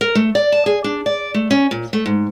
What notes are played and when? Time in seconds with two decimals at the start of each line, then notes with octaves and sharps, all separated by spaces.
0.01 A#4
0.15 A3
0.35 D5
0.52 A5
0.66 G#4
0.84 D4
1.06 D5
1.34 A3
1.51 C#4
1.71 A#2
1.93 A3
2.06 G#2